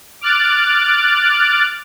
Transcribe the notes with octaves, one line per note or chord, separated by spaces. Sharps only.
D6 F6 F#6 A6 D7